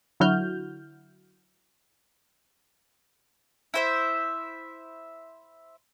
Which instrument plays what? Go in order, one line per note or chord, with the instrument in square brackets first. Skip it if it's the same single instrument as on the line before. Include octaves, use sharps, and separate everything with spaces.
[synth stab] D3 F#3 E4 F#4 F6 G6
[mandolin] E4 C5 E5